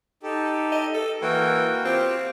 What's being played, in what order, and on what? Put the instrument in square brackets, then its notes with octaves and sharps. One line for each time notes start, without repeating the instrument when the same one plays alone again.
[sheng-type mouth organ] D#4 G4 A4
[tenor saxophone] D#5
A4
[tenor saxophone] E3 [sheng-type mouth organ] A#3 F#4 G5
[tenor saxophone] C4 [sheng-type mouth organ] F4 G4